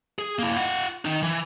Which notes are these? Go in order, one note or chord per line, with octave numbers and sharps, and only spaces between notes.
G#4
A#3 E4
F4 F#5
D#3 D#4
E3